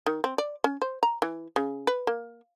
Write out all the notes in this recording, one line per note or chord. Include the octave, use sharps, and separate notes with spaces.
D#3
C4
D5
C#4
C5
A#5
E3
C#3
B4
A#3